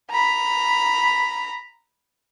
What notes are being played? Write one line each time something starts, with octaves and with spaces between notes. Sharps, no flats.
A#5 B5